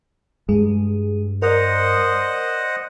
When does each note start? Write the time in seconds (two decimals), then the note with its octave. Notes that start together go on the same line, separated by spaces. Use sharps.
0.49 G2 G#3 G#4
1.42 A#4 C5 D5 D#5 F#5